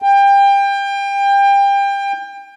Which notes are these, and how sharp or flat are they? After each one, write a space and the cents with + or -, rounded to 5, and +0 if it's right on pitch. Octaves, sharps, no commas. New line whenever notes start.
G5 +25